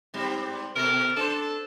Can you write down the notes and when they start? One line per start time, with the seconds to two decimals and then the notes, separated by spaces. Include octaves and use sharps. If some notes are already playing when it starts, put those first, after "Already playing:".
0.14 G#2 G3 C4
0.76 B2 A4 A#4
1.16 D4 A4 C5